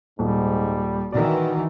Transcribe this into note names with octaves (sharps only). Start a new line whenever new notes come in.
D#1 G#2 G3
D#3 E3 F#4 D5